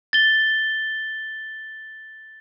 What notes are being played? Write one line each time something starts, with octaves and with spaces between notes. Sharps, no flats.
A6 G7